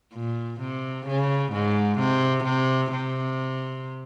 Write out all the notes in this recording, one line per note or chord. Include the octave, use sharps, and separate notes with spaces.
A#2
C3
C#3
G#2
C3
C3
C3